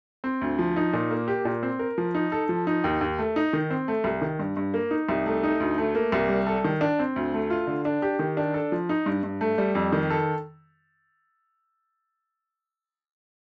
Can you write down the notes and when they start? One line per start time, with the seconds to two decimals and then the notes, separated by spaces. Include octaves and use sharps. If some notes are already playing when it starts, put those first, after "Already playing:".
0.24 C4
0.41 D2
0.59 F3
0.76 D#4
0.93 A#2
1.11 A#3
1.28 G4
1.45 A#2
1.63 C4
1.79 A#4
1.98 F3
2.15 D#4
2.32 A4
2.49 F3
2.67 D#4
2.84 D#2
3.01 D#2
3.19 A3
3.36 D#4
3.53 D#3
3.71 C4
3.88 A3
4.04 C2
4.22 D#3
4.39 G2
4.57 G2
4.74 A#3
4.91 D#4
5.09 C2
5.26 A3
5.43 D#4
5.60 D2
5.78 A3
5.95 A#3
6.12 C2
6.29 G3
6.47 A4
6.64 D#3
6.81 D4
6.99 C4
7.16 D2
7.34 A3
7.50 F4
7.67 D3
7.85 D4
8.02 G4
8.19 D#3
8.37 D4
8.54 A4
8.72 F3
8.89 D#4
9.06 G2
9.24 G2
9.41 A3
9.58 G3
9.75 F2
9.92 D#3
10.10 A4